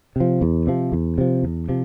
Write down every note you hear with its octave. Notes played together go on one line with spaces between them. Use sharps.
C3 F3
E2
C3 F3
E2
C3 F3
E2
C3 F3